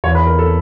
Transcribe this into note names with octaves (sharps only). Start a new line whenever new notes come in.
E2 C#5
B4
A#4
A4